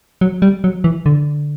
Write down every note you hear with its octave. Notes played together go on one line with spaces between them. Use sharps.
F#3
G3
F#3
E3
D3